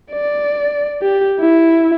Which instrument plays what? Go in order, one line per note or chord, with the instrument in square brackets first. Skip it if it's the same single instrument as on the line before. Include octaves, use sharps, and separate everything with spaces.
[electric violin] D5
G4
E4